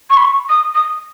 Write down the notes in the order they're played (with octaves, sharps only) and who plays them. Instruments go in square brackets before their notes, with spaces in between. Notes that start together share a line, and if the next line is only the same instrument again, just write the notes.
[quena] C#6
B5
C#6
D#6
D#6